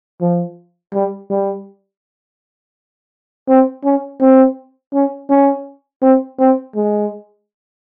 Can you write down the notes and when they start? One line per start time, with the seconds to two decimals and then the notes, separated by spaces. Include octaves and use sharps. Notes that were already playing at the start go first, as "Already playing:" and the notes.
0.21 F3
0.93 G3
1.30 G3
3.48 C4
3.84 C#4
4.20 C4
4.94 C#4
5.29 C#4
6.02 C4
6.39 C4
6.75 G#3